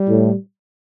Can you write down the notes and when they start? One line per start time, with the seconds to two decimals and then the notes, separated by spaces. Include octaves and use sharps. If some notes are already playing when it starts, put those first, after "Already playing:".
Already playing: G3
0.08 A2